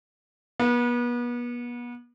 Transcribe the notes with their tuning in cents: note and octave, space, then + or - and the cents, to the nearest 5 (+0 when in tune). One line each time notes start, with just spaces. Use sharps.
B3 -35